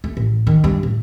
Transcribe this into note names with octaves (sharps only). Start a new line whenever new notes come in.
A3
A1
D#3
G2
A2